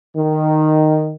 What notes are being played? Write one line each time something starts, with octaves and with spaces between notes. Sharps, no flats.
D#3